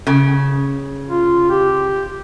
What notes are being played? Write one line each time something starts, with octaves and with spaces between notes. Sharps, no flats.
C#3
F4
G4